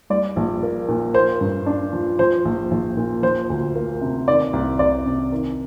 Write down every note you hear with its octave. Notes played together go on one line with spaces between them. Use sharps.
G3 D5
A#1
A#3
A#2
A#3 C5
G2
D4
F3
F3 C5
A#1
A#1
A#2
F3 C5
D2
A#3
C3
D#3 D5
C2
C2 D5
C3
D#3